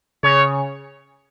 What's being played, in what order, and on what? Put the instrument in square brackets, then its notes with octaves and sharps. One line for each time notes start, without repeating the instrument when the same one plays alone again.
[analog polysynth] C#3 [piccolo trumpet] C#5